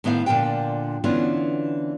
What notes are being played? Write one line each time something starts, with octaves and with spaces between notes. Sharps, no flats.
A2 D#3 B3 C5 D5 F5
A#2 D3 F3 A#3 D4 G5
D3 E3 B3 C#4 D4 F4